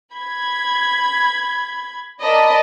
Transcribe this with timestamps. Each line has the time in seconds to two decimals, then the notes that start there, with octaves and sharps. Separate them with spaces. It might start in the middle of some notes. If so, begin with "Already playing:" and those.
0.13 B5 G#6
2.22 A#4 D5 D#5 A5 B5